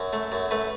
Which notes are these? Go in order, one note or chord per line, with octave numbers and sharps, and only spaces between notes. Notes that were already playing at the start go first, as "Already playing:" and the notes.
Already playing: F#2
A3
F#2
A3 B4